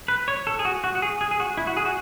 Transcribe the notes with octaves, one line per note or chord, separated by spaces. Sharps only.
B4
C#5
A4
G#4
F#4
F#4
F#4
G#4
G#4
G#4
F#4
E4
F#4
G#4
F#4